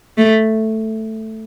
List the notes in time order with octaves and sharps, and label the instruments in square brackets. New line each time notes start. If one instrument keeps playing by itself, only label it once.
[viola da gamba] A3